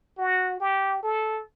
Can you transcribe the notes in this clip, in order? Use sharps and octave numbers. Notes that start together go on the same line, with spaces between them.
F#4
G4
A4